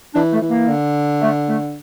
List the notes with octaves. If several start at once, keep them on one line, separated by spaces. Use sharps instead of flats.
E3 D4
A3
E3
A#3
D3
A3
A3